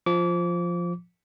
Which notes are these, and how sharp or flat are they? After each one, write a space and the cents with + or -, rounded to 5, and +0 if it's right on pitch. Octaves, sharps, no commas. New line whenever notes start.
F3 +0 D6 -30